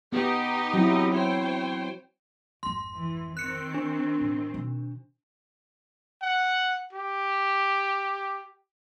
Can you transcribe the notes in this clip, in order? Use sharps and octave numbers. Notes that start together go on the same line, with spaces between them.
B3 D#4 G4 D#5
F#3 C4 E4
C5 C#5 G5
G#1 F2 C6
E3
D#3 C4 F#6 C#7
D4
A2
B2 D#4
F#5
G4